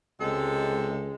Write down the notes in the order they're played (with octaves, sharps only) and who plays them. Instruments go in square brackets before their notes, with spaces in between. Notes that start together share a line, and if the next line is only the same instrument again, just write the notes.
[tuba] C#2 [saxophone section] C3 A4 [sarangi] G#3